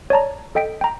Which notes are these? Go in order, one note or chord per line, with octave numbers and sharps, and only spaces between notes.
C#5 D5 A5 A#5
A4 D#5 G5 B6 D7
G5 A#5